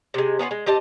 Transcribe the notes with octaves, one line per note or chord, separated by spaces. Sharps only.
C3 G#3
B3 C#4 F4 B4
G#3
C4 G4 D#5 A5